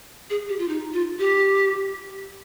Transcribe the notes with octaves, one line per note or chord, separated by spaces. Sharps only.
G#4
G4
F4
D#4
F4
G4